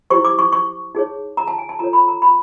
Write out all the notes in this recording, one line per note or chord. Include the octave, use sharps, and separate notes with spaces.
E4 G4 C5 C#6
D6
C#6
C#6
D#4 G#4 C#5
A#5
A5
G#5
A5
F4 A4 C#5 A#5
B5
A#5
B5